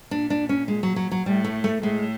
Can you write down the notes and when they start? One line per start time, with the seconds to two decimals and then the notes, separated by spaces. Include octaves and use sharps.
0.11 A#2 D4
0.30 D4
0.49 C#4
0.68 G#3
0.83 F#3
0.96 F#3
1.11 F#3
1.25 A2 G3
1.44 A3
1.64 A3
1.82 A2 G#3